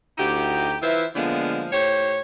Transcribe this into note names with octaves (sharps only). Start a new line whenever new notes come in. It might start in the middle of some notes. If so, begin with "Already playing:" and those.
D2 D#4 E4 F#4 G4
E3 F4 C5 E5
D3 F3 G#3 A#3 B3 F4
A2 G4 C5 C#5